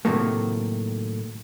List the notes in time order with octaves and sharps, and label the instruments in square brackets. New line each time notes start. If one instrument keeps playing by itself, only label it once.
[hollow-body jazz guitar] A2 C3 D#3 F#3 A3 A#3